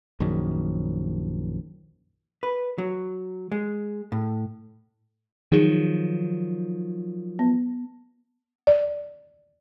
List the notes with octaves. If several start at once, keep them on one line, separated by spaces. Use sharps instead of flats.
A#1 F#2 D#3 F#3
B4
F#3
G#3
A2
D#3 F3 F#3 D#4 G#4
B3
D5